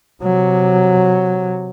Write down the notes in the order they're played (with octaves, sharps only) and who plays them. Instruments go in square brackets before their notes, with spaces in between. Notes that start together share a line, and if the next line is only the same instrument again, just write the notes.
[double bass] C3 F#3